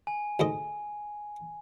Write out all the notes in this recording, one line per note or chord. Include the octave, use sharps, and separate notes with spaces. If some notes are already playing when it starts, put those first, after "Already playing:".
G#5
D2 G#2 D#5